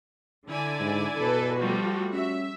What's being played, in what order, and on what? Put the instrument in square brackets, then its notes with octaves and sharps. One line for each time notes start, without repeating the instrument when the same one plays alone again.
[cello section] D3 [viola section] E4 D5 G#5
[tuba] G#2
[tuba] B2 [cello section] A4 B4
[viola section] F3 G3 A3 [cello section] F#4
[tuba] C#4 [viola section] E5